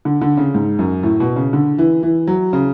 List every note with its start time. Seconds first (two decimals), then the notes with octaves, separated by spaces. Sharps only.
0.05 D3
0.21 D3
0.38 C#3
0.54 G#2
0.79 F#2
1.03 A2
1.20 B2
1.36 C#3
1.53 D3
1.79 E3
2.03 E3
2.27 F#3
2.53 C#3